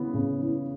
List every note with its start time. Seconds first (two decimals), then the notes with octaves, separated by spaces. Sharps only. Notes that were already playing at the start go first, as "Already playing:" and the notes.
Already playing: C#3 E3 B3
0.14 C#3
0.41 E3